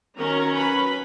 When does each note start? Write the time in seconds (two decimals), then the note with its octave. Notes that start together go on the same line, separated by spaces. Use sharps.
0.17 D#3 F#3 C#4 A#4 A#5
0.55 B4 B5